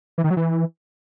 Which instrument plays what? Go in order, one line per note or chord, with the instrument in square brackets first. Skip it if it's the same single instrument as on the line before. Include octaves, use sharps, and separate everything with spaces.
[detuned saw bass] E3
D#3
F#3
E3